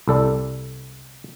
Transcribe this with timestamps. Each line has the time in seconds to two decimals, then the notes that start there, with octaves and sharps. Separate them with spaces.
0.08 C2 A4 D5